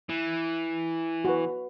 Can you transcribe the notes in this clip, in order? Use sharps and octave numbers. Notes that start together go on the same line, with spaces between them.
E3
F#4 B4